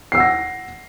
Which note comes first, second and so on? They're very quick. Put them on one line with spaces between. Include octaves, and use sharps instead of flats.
C7 E6 F#5 A#6